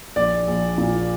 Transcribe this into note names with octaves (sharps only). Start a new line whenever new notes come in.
A#1 D5
A#1
A#2